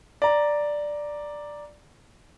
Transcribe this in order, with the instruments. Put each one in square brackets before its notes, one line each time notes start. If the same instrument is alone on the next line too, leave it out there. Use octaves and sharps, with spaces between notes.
[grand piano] D5 A#5